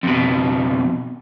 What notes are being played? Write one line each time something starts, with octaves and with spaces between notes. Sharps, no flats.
F2 B2